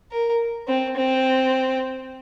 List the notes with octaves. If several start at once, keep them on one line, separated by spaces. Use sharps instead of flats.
A#4
C4
C4